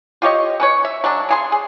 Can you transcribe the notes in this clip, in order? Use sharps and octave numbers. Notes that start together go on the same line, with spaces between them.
F4 G4 C#5 D#5
C#4 B4 C#5
E5
F#3 G#3 D4
C#3 G#4 C6
G#4